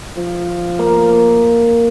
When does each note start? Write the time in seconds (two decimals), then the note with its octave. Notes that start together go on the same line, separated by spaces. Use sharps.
0.16 F3
0.79 A#3